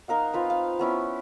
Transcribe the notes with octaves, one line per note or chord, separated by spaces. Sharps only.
D#4 A#4 F5 F#5
C4 F4 B4
F5
B3 C#4 E4